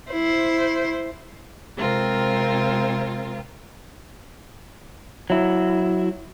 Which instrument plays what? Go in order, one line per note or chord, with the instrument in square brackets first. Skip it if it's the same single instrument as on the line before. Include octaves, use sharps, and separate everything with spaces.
[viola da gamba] E4 C5
[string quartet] C3 G#3 C4 F4 A#4
[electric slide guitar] F#3 E4